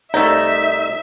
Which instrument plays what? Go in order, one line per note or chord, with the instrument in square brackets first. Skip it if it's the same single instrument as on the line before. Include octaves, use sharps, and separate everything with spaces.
[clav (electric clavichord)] C2 A3 [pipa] D#4 [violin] E5